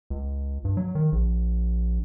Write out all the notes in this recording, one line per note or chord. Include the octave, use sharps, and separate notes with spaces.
C#2
G2
F#3
D#3
A#1